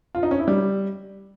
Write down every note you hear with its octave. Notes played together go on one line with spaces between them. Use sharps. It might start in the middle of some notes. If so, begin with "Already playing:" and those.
F4
D#4
C#4
E4
G3